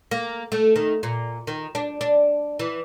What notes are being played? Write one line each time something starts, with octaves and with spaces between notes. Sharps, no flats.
A#3
A3
D#3
A#2
D#3
D4
D4
E3